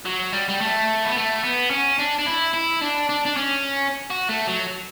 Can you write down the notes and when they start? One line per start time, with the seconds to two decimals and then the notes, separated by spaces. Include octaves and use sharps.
0.06 F#3
0.33 G3
0.49 G3
0.61 A3
1.05 B3
1.16 A3
1.44 B3
1.71 C#4
1.99 D4
2.19 D4
2.27 E4
2.54 E4
2.82 D4
3.09 D4
3.25 D4
3.36 C#4
4.11 F#4
4.29 A3
4.47 F#3